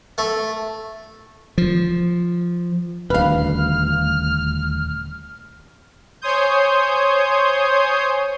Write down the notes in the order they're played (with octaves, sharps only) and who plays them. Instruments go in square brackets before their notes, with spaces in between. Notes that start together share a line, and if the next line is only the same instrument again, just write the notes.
[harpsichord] A3
[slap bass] F3
[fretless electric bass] D#1 D2 [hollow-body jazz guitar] B4 F5 [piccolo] F6
[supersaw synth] C5 C#5 G#5 C6 D#6 G6